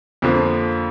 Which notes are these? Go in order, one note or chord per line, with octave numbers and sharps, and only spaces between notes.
F2 D3 F3 A#3